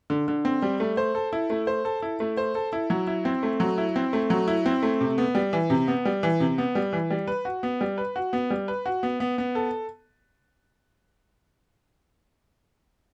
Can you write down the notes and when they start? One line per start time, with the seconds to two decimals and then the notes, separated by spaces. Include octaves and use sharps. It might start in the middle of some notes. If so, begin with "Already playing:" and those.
0.10 D3
0.28 D3
0.45 C4
0.62 G3
0.80 A3
0.97 C5
1.15 A4
1.33 E4
1.50 A3
1.67 C5
1.85 A4
2.02 E4
2.20 A3
2.37 C5
2.55 A4
2.73 E4
2.90 F#3
3.07 E4
3.25 C4
3.43 A3
3.60 F#3
3.78 E4
3.96 C4
4.13 A3
4.30 F#3
4.48 E4
4.66 C4
4.83 A3
5.01 C3
5.18 B3
5.35 G3
5.53 E3
5.70 C3
5.88 B3
6.05 G3
6.23 E3
6.40 C3
6.58 B3
6.75 G3
6.93 E3
7.10 G3
7.28 B4
7.45 F#4
7.63 B3
7.81 G3
7.98 B4
8.16 F#4
8.33 B3
8.50 G3
8.68 B4
8.86 F#4
9.03 B3
9.20 B3
9.38 B3
9.55 A4